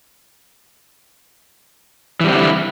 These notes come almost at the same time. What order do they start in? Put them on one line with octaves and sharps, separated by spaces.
E3 G3 C4 D3 E4